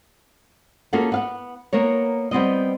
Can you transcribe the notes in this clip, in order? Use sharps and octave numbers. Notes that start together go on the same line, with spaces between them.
A#3 C#4 F4 F#4 G#4 A4
B3 F5 F#5
A#3 B3 A#4 C#5
G3 B3 C4 D#5